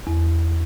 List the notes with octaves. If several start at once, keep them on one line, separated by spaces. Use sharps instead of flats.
E2